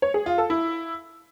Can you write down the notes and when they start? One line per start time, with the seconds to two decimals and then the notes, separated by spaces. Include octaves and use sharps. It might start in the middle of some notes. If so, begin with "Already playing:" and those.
0.02 C#5
0.14 G#4
0.26 F4
0.38 A4
0.50 E4